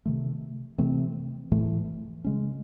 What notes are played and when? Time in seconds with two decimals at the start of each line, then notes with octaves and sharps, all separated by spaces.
0.06 C3 D#3 A3
0.78 C3 E3 A3 C4
1.52 A2 E3 A3
2.24 C#3 G#3 C#4